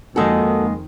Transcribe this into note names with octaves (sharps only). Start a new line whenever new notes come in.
F2 D#3 G#3 A#3 D#4 F#4 G#4 A4